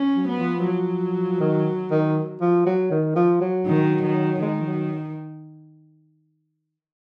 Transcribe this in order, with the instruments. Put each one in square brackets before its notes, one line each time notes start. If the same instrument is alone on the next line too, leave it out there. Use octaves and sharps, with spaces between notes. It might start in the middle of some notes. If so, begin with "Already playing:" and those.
Already playing: [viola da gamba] C#4
[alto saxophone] F#3
[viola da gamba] B3
[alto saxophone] F3
[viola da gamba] F#3
[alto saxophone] D#3
D#3
F3
F#3
D#3
F3
F#3
[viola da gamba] D#3
D#3
[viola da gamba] D#3 [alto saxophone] G#3
[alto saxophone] F3
F#3